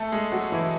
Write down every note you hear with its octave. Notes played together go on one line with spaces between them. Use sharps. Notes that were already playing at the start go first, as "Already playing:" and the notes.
Already playing: A3 A4
G#3 G#4
F#3 F#4
E3 E4